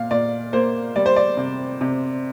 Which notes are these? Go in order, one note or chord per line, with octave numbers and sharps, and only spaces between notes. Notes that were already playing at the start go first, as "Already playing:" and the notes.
Already playing: A#2 F5
A#2 D5
A#3 C5
G3 D5
C5
D5
C3
C3